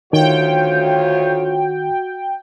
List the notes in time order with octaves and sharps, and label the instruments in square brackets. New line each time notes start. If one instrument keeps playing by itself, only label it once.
[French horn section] D2 F4 C#5 [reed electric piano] D#3 [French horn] F#4 [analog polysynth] G5